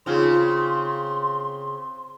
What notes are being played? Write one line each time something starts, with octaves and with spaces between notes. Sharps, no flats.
C#3 C4 D#4 F4 G#4 C6